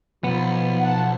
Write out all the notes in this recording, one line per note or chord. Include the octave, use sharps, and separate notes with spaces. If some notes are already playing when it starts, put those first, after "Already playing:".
B1 F3 B3
F#5 A5